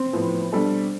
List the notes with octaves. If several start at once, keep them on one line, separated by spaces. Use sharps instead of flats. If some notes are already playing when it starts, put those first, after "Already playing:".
Already playing: C4
A2 F3 B3
B2 G3 D4 A4